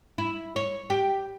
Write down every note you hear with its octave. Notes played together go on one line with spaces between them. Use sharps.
E4
C#5
G4